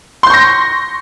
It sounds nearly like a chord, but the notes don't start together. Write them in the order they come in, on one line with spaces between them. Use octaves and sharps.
C6 G6 C#6 A#6